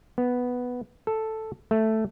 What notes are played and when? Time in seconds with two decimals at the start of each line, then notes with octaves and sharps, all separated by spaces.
0.18 B3
1.07 A4
1.71 A3